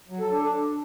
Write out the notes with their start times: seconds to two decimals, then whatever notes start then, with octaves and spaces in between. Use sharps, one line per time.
0.09 F#3
0.20 A4
0.31 D4